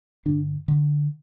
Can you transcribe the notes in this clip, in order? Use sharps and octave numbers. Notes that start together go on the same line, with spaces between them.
G2 D3 D4
D3